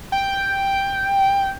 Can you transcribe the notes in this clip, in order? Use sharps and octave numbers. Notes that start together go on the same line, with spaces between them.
G5